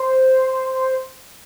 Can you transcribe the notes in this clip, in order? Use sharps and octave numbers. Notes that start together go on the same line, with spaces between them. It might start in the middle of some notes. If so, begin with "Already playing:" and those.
Already playing: C5